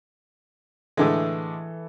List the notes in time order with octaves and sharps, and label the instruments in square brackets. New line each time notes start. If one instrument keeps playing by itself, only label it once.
[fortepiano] A2 D3 G#3 [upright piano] E3 A4